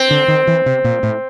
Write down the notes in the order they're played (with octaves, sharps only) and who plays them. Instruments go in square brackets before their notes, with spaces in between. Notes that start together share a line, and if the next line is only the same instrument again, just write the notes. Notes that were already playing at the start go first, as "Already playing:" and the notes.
Already playing: [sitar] C4
[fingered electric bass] D3
D#3
E3
C3
A#2
A2